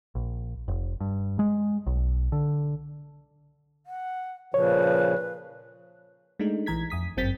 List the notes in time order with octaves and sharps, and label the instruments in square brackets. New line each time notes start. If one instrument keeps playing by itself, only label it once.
[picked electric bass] A#1
F1
G2
G#3
B1
D3
[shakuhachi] F#5
[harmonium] A#2 C#3 F3 [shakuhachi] B4 [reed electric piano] C#5
[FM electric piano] G#3 A3 D4 D#4
A#1 E3 A#5 G#6 B6
F2 D#6 B6
G1 F#2 C4 G6 A6 B6